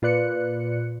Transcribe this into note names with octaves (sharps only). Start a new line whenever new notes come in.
A#2 F4 B4 D5 F#6 C#7